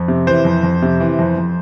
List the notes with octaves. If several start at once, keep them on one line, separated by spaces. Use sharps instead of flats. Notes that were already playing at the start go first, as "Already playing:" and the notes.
Already playing: F2
C3
E3 C5
F2
F2
C3
E3
F2
F2